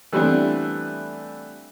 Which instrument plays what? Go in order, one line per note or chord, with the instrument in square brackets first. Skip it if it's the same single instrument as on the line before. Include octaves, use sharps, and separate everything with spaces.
[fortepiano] E3 G3 A3 B3 C4 D4